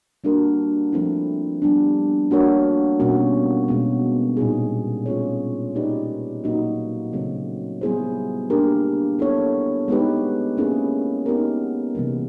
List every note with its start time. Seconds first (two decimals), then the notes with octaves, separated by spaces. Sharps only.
0.24 G3 A#3 D4 F#4 A#4
0.93 F3 A3 C4 E4
1.62 G3 B3 D4
2.31 A#3 D4 F#4 A#4 C#5
3.00 B2 G3 A#3 C#4 F#4
3.68 B2 G#3 B3
4.37 A#2 G3 C4 D#4 G#4
5.06 A3 C#4 F4 G#4 C#5
5.75 A#3 D#4 G4 B4 D5
6.44 A#2 F#3 A#3 D#4 F#4
7.13 C#3 F#3 A3 C4
7.81 G3 B3 E4 G#4 C5
8.50 A#3 D4 G4 A#4
9.19 B3 E4 A4 C#5
9.88 G#3 B3 D#4 G4 B4
10.57 A#3 C#4 E4 G#4
11.26 B3 D#4 G4 A#4
11.95 C3 E3 G3 A#3